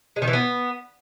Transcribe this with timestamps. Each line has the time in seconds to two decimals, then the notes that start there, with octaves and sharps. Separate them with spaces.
0.16 G#3
0.22 D#3
0.28 E3
0.33 B3